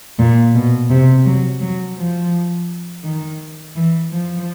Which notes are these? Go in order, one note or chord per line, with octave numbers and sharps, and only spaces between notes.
A#2
B2
C3
F#3
F#3
F3
D#3
E3
F3